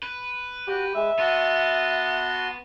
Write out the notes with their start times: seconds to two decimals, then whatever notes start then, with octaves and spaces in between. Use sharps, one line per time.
0.03 B4
0.68 F#4 G4
0.95 G#3 E5
1.19 B3 F#4 A5 C6